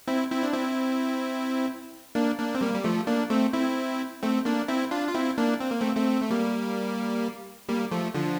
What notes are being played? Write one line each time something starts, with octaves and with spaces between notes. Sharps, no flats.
C4 E4
C4 E4
D4
C4 E4
A#3 D4
A#3 D4
C4
G3 A#3
G3
F3 A3
A#3 D4
A3 C4
C4 E4
A3 C4
A#3 D4
C4 E4
D4 F4
F4
C4 E4
A#3 D4
C4
A#3
A3 C4
A3 C4
A3
G3 A#3
G3 A#3
F3 A3
D3 F3